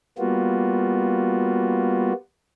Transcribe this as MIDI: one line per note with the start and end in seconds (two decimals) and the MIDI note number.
0.18 2.13 55
0.18 2.13 58
0.18 2.13 59
0.18 2.13 65
0.18 2.13 66